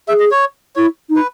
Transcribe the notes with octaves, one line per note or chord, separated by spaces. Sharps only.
G#4 E5
D#5
C#5
E4 C#5
D#4
B4